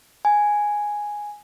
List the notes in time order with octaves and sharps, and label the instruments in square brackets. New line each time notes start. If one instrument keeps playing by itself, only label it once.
[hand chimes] G#5